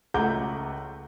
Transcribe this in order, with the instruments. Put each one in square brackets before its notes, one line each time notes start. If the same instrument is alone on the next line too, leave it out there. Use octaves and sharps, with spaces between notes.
[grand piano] C#2 A3 F#5 A#5 D6 G6